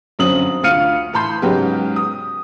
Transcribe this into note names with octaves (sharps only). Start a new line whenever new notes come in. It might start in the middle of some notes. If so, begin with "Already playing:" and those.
G1 F#2 F#3 C4 D#6 F#7
D2 F4 F5 F6 C#7 D#7
A2 E3 A5 B5 C6 G6
G#2 C#3 F#3 G#3 B3 G4
D#6